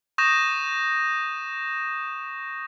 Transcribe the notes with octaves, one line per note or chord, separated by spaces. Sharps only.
C#6 D#6 G6 A#6 E7